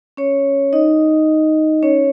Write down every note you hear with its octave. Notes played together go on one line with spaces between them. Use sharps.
C#4 C#5
D#4 D#5
C#4 C#5